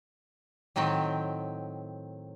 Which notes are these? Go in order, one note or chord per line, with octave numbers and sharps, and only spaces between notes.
A2 D#3 F#3 C4 G5